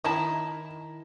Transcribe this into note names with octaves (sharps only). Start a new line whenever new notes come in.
D#3 E4 A5 A#5